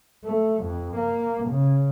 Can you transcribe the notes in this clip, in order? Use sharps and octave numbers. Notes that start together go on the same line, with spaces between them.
A3
F2
A#3
C#3